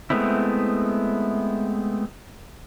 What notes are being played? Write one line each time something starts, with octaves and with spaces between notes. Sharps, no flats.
G#3 A3 B3 C4 E4